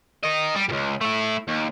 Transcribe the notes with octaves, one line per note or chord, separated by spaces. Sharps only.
A#4 D#5
G3
C#2 G#2
A3 E4
D#2